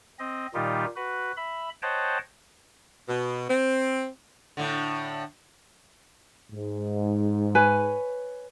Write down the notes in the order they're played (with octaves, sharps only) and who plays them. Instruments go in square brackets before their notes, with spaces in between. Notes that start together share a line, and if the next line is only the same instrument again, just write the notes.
[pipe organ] C4 D#5
A#2 D#3 G3 D#4 F4 G4
F#4 B4
E5 B5
C5 C#5 D#5 F#5 G5 A5
[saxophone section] B2
C4
[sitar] A2 D3
[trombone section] G#2
[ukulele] B4 C#5 G#5